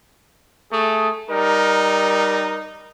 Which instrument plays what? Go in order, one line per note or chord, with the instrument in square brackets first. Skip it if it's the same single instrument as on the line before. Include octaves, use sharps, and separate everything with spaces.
[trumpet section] A3 G#4 D#6
[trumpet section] G3 A#4 [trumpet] D#4